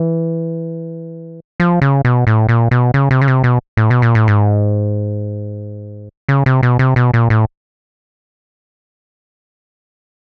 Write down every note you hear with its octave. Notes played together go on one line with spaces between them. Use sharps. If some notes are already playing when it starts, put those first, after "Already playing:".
Already playing: E3
F3
C#3
B2
A2
A#2
B2
C#3
C3
C#3
C3
B2
A2
B2
A#2
A2
G#2
C#3
C3
B2
C3
B2
A#2
A2